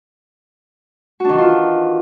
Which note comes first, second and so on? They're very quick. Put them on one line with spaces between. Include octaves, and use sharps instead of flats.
F#4 D4 D#3 E3 F4